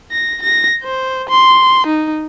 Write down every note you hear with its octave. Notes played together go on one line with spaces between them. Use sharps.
A#6
A#6
C5
C6
D#4